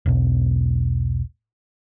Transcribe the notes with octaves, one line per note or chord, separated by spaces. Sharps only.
E1 B1